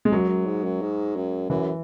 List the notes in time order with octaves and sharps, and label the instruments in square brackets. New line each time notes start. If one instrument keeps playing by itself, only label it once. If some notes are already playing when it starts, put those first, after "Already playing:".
[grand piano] G#3
[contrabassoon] F#2 [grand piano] F#3
[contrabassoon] F#2
G#2
F#2
G#2
F#2
[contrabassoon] F#2 [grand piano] E3